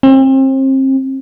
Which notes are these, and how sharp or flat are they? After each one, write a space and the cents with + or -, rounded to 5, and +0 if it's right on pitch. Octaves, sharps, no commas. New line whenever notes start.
C4 +35